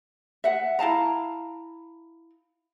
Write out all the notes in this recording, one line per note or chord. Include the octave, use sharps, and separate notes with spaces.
E5 F#5
E4 F5 A5 A#5